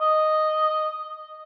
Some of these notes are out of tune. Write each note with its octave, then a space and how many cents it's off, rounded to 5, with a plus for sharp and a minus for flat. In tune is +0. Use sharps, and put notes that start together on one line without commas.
D#5 -5